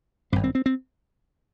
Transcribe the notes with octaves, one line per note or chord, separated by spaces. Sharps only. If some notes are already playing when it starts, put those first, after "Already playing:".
G#1 G2 C4
C4
C4
C4